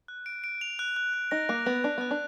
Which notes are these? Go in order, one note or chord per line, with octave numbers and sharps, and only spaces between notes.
F#6
D7
D7
F7
F#6
F#6
F#6
D#4 A#6
A#3 F#6
B3 F#6
D4 F#6
B3 F#6
D4